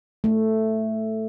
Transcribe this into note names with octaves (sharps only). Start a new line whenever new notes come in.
A3